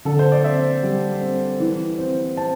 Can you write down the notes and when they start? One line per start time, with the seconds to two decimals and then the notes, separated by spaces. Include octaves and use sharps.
0.05 D3 A4
0.19 C5
0.32 D5
0.44 C4 E5
0.83 G3
1.21 C4
1.60 E3
1.98 C4
2.37 C4 A5